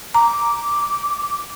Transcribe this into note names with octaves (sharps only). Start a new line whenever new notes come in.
A#5 D6